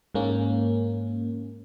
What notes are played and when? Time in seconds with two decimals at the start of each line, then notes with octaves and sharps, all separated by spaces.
0.15 G#2 A#3 C#4